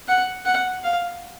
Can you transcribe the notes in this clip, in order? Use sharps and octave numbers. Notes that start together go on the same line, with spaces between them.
F#5
F#5
F5